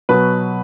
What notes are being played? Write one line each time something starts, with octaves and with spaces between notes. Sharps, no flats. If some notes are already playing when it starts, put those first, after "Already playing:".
B2 F#3 B4